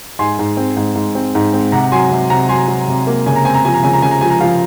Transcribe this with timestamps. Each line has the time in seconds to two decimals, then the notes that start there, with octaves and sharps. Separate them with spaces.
0.19 G#2 G#5 C6
0.39 G#2
0.57 C4
0.76 G#2
0.95 G#2
1.15 C4
1.35 G#2
1.53 C4
1.72 C3 F#5 A#5
1.92 F#3 G#5 C6
2.11 C3
2.30 C3 F#5 A#5
2.49 F#3 G#5 C6
2.68 F#3
2.88 C3
3.07 A#3
3.26 C#3 G#5
3.36 A#5
3.45 C4 G#5
3.54 A#5
3.65 F3 G#5
3.74 A#5
3.83 C#3 G#5
3.93 A#5
4.02 C#3 G#5
4.11 A#5
4.21 F3 G#5
4.30 A#5
4.40 F3 F5 G#5